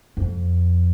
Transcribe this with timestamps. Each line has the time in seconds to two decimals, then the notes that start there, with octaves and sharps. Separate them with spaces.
0.17 F2